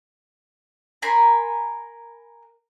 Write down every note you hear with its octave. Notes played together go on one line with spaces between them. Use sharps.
A#4 G#5 B5 C6